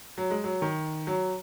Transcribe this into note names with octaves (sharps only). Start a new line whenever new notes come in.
F#3
G#3
F#3
D#3
F#3